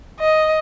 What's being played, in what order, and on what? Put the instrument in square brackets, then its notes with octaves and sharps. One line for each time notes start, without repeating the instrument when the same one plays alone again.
[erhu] D#5